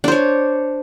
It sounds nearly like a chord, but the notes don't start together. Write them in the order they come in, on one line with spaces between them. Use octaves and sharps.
D4 C5 C#5